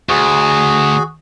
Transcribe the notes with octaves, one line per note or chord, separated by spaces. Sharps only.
D2 F#4 G#4